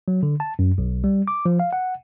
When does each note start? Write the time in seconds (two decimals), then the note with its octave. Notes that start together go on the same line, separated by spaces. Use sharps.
0.08 F#3
0.23 D3
0.40 A5
0.59 F#2
0.78 B1
1.04 G3
1.28 D6
1.46 F3
1.60 F5
1.73 F#5